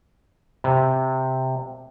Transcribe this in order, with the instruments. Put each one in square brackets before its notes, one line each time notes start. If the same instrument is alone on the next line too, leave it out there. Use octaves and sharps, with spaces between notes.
[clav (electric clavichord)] C3